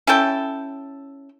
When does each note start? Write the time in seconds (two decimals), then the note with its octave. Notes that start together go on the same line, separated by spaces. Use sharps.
0.07 C#4 E4 A4 G5